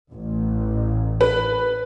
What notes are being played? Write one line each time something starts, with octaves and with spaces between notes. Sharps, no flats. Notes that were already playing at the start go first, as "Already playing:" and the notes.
A1
B4